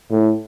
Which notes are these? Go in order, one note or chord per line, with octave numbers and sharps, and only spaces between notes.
A2